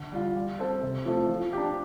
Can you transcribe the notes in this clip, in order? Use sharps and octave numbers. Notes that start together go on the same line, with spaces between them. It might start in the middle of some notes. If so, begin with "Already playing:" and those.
Already playing: D3
G3 F4
G3
C4 A4 C5
C3
F3 A3 C4
F3
D4 G4